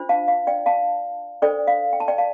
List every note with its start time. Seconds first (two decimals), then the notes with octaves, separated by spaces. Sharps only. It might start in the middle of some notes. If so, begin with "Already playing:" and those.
Already playing: D4 F4 C5
0.09 F5 A5
0.28 F5
0.47 D5 G5
0.66 F5 A5
1.42 D4 A4 C5 D5 G5
1.67 F5
1.93 G5
2.00 A5
2.08 D5 G5
2.18 F5 A5